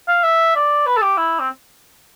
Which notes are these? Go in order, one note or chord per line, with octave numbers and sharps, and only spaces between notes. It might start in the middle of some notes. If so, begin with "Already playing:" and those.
F5
E5
D5
B4
A4
G4
E4
C4